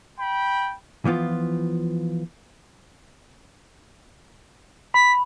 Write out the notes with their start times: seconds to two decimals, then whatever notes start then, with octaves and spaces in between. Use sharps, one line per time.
0.19 G5 B5
1.05 E3 F3 B3 F4
4.94 B5 B6